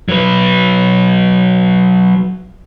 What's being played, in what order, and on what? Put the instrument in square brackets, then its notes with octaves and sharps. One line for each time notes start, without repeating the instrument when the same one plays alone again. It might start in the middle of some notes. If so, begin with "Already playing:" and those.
[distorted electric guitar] F#3 B4